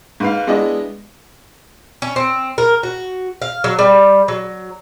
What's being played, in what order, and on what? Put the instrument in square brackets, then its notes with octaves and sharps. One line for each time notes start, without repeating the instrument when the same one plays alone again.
[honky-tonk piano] G#2 B4 F5
G#3 B3 D4 E4 D#5
[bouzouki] C#4
C4
A#4
F#4
F5
F#3
G3
F#3